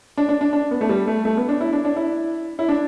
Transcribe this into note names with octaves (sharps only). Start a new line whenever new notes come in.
D4
D4
D4
D4
B3
A3
G3
A3
A3
B3
D4
E4
D4
D4
E4
E4
D4